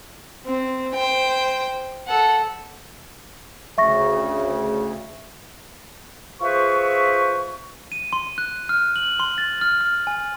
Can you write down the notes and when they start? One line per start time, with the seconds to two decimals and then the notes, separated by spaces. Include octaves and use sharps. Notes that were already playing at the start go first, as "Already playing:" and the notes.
0.46 C4
0.94 C5 G5
2.07 A4 F#5
3.78 D2 C#3 E5 C#6 A#6
6.40 F4 G#4 B4 C5 E5 C#6
7.92 D#7
8.13 C6
8.38 F#6
8.69 F6
8.96 F#7
9.20 C6
9.38 A6
9.61 F6
9.81 F6
10.07 G#5